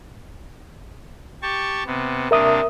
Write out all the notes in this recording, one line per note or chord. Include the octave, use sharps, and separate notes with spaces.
G4 A5 C#6
C3 B3
C3 A#3 D4 A#4 E5 D#6